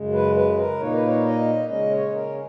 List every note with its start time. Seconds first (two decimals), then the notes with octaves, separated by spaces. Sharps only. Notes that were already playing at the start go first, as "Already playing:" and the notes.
Already playing: F#2 C#3 G#3
0.13 B4
0.35 B4
0.58 A#4
0.79 A#2 A#3 D#4 C#5
0.93 B4
1.07 C#5
1.24 D#5
1.69 C#3 G#3 C#4 D#5
1.91 C#5
2.13 A#4